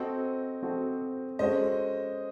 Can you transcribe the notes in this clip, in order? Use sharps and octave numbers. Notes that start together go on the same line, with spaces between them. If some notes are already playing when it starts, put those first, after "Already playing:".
Already playing: C4 F#4 A4 C5 D#5
C4 F#4 A4
G#3 C#4 F#4 A4 C5 D#5